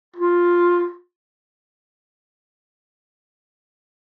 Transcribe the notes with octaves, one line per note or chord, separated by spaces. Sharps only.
F4